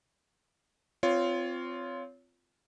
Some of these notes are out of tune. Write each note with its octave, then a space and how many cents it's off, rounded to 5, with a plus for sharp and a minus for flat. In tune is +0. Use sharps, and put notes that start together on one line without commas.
C4 -15 F4 -5 C#5 +20